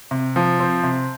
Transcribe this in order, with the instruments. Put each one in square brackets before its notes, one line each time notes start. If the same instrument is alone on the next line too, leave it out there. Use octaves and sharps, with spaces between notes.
[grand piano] C3
F3
C4
C3